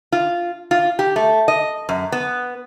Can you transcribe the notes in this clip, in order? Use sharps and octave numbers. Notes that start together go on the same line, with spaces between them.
F4
F4
G4
A3
D#5
F#2
B3